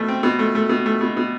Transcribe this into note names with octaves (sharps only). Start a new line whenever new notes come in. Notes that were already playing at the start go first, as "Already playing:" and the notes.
Already playing: B2 A3
C4
B2
A3
A3
B2
A3
B2
B2